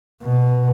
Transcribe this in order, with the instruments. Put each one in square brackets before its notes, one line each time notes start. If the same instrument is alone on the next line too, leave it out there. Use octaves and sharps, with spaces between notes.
[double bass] B2